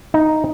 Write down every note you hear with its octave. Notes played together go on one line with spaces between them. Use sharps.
D#4